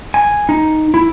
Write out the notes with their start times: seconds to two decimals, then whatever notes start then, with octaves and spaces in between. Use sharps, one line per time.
0.14 G#5
0.49 D#4
0.94 E4